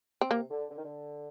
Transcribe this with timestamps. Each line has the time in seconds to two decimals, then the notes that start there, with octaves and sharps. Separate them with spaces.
0.21 C4
0.30 C3 A#3
0.50 D3
0.71 D3
0.77 D#3
0.85 D3